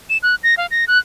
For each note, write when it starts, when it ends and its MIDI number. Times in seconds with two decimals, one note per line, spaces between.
0.10 0.18 100
0.23 0.35 90
0.44 0.55 94
0.57 0.67 77
0.71 0.85 94
0.88 0.99 90